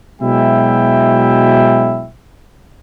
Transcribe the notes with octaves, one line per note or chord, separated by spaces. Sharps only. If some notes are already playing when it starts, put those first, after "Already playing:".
B2 F#3 G#3 E4 E5 G5